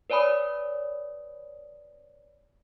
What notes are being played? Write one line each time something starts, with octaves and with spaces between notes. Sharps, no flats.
B4 C#5 D5 G#5 B5 D#6